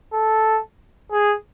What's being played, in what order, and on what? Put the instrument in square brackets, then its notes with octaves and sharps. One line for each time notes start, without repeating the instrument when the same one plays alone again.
[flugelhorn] A4
G#4